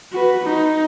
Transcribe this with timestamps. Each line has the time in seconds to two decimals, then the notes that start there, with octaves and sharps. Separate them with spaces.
0.12 F#4 B4
0.44 D#4